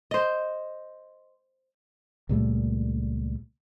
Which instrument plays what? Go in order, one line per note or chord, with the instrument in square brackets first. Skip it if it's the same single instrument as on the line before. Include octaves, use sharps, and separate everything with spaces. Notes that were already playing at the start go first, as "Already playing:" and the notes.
[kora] C5 D#5
[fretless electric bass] C#2 A#2 G3 A3